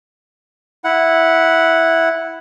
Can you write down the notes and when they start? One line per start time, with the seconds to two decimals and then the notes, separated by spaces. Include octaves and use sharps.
0.84 E4 F#5